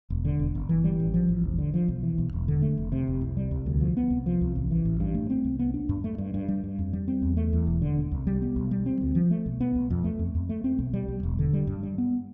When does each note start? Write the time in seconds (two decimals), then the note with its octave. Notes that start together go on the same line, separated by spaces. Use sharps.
0.10 E1
0.25 D3
0.39 E1
0.55 G1
0.69 E3
0.84 G3
1.00 A1
1.14 F3
1.29 A1
1.44 E1
1.58 D3
1.74 F3
1.88 B1
2.03 E3
2.18 B1
2.33 E1
2.48 D3
2.62 A3
2.78 F1
2.92 C3
3.08 F1
3.21 C2
3.37 G3
3.51 C2
3.66 D2
3.81 F3
3.97 B3
4.10 C2
4.26 F3
4.41 C2
4.56 A1
4.71 E3
4.85 A1
5.00 G2
5.14 A3
5.30 C4
5.44 C2
5.59 B3
5.74 D4
5.89 G2
6.04 A3
6.18 G2
6.34 G2
6.48 G3
6.64 G2
6.79 F2
6.93 G3
7.08 C4
7.22 E2
7.37 A3
7.53 E2
7.67 E1
7.82 D3
7.97 E1
8.11 C2
8.27 G3
8.42 B3
8.56 B1
8.71 G3
8.86 C4
9.01 D2
9.15 F3
9.31 A3
9.46 B1
9.60 B3
9.75 B1
9.90 F2
10.04 A3
10.19 F2
10.35 F2
10.49 A3
10.64 C4
10.79 B1
10.93 G3
11.08 B1
11.23 E1
11.39 D3
11.53 G3
11.67 G2
11.83 G3
11.98 B3